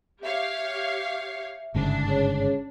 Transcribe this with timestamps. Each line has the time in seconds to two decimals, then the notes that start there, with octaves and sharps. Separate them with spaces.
0.23 G4 C#5 E5 F5
1.75 G1 G#2 C#3 D4
2.06 C#4 G#4 C#5